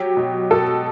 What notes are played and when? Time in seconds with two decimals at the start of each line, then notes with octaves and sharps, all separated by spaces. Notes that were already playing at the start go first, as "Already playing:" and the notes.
Already playing: F#3 G4
0.17 B2
0.51 B2 A4